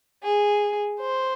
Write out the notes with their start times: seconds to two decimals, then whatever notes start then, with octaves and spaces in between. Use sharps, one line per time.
0.23 G#4
0.99 C5